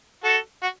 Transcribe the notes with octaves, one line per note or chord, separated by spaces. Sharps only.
F#4 A4
F#4